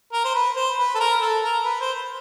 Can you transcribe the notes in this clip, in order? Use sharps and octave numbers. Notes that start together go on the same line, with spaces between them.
A#4
C5
B4
C5
B4
A4
A#4
A4
A#4
B4
C5